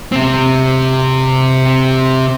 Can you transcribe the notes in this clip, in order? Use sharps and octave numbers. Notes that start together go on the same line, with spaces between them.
C3 C4